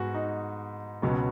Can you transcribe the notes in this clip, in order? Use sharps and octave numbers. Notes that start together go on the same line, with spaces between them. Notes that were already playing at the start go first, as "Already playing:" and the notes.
Already playing: G#2 B3 F#4 G#4 B4
D#4
C#2 B2 F#3 B3 C#4